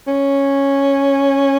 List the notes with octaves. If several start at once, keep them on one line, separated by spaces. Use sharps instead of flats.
C#4